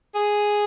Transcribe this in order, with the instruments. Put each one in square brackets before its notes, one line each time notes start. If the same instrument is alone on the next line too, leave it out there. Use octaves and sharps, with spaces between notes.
[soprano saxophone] G#4